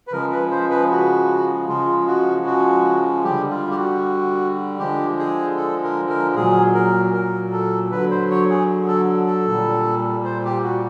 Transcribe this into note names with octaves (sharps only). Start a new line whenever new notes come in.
B4
C#3 F3 G#3 A#4
B4
C5
B4
F#4
C#3 F3 G#3 F4
F#4
F#4
D3 G3 G4
F4
G4
F#4
D3 F3 G#3 G4
G#4
A4
A#4
A#4
A#2 F#3 G#4
A#4
A#4
A4
D3 F#3 B4
C5
C#5
G#4
A4
A4
A#2 G3
C5
G4
F#4